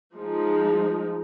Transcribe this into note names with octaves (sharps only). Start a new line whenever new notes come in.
F3 G#3 D#4